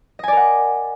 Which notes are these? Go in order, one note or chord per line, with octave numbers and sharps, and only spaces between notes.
A#4 D5 D#5 F#5 G#5